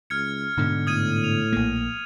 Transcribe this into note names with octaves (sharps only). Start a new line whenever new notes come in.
C#2 F6 G#6 C#7
D2 G#2 B2 D3
A2 D#6 G#6 D#7
F7
A#1 A#3